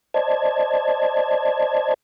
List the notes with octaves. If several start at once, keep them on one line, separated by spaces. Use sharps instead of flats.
C5 D5 D#5 A5 G#6